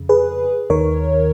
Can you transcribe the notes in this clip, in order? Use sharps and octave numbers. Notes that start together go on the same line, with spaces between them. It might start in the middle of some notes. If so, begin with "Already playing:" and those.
Already playing: F2 C#3
G#4 B4
D#2 D#3 A#4 C#5